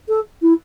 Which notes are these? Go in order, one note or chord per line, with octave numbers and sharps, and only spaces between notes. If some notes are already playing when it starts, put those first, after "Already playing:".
A4
E4